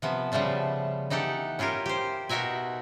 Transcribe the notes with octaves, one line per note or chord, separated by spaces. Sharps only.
C3 F3 B3
C#3 F3 G3 A3 B3
E3 D#4 G4 A4 F#5
C#4 E4 F4 G4 A#4
G4 C5
B2 D#4 F#4 A#4 E5 G#5